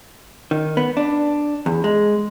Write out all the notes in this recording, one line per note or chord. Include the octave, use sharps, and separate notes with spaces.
D#3
B3
D4
E2
G#3